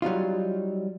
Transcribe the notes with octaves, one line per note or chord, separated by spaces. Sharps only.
F#3 G3 D#4 F4